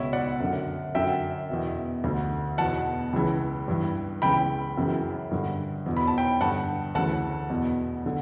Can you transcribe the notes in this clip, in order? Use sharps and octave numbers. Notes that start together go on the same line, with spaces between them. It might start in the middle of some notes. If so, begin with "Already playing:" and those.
Already playing: C#2 B2 C#5 E5
D5 F#5
F#2 D3
F#2 D3 E5 G5
E2 B2
D2 D3
E2 B2 F#5 A5
C#2 C#3 E3
G2 E3
C#2 C#3 E3 G5 B5
F#2 C#3 E3
G2 D3
E2 B2
B5
A5
G5 B5
G2 D3 F#5 A5
D2 C#3 E3 F#5 A5
E2 B2
D3